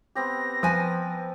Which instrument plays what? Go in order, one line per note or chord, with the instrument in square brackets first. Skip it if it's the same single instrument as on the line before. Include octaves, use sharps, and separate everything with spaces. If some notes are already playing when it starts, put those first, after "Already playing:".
[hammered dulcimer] B3 C4 G4 [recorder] A#6
[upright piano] F3 [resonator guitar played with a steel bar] B4 G#5